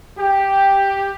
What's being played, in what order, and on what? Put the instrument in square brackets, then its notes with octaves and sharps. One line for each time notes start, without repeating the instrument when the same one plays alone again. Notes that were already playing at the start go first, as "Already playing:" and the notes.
[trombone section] G4